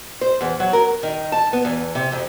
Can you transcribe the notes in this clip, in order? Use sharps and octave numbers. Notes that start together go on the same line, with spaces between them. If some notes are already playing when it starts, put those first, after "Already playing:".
C5
E2
F#3
A#4
D#3
A5
B3
E2
C3
F2